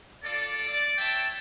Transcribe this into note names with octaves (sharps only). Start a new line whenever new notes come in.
F4 A4 D5
D5
C#5 E5 G5 A5